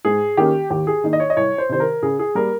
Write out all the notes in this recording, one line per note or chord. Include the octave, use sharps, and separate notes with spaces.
G#2 G#4
D#3 A#3 C#4 G4
D#2 G4
G#4
D#3 A#3 D#4
D#5
C#5
D#5
C2 C#5
C5
C3 D#3 C5
A#4
C#3 G#4
G#4
G3 A#3 A#4